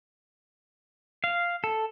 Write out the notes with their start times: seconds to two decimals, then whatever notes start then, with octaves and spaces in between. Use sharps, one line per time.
1.24 F5
1.64 A4